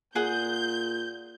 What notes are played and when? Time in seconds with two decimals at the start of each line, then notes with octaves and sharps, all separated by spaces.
0.15 A#2 G#4 F#5 G6